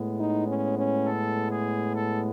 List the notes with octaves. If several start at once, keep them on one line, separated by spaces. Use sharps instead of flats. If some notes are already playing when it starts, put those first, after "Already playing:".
Already playing: A2 G#3 B3
D#4
C#4
C#4
A4
G#4
A4